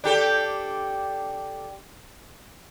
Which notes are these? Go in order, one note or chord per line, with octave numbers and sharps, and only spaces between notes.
D4 G4 A4